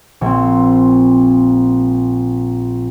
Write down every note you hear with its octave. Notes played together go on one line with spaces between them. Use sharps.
A#1 C4